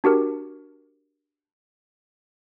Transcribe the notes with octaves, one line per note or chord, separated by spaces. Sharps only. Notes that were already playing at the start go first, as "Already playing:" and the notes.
D4 F#4 G4 A#4